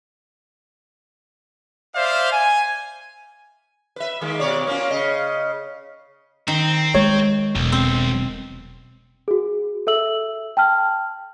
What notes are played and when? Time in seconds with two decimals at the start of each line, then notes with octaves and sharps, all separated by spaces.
1.94 C5 D5 E5 F5
2.31 G#5
3.96 B4 E5
4.21 D#3 G#3 A#3
4.39 B2 C#5 D5
4.67 A#3 C#4 F4
4.91 C#3 D#5
6.48 D#3 C4
6.94 G#3 C#5
7.55 E1 B1
7.72 C4
9.28 F#4 G#4
9.87 A4 E5 E6 F#7
10.57 G5 A5 F6